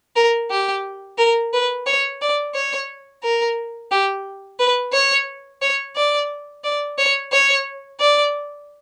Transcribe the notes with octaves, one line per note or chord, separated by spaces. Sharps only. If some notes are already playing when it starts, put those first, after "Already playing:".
A#4
G4
A#4
B4
C#5
D5
C#5
A#4
G4
B4
C#5
C#5
D5
D5
C#5
C#5
D5